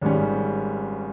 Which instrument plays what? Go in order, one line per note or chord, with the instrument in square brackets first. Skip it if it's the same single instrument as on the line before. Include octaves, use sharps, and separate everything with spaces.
[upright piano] G#1 G#2 G3 C#4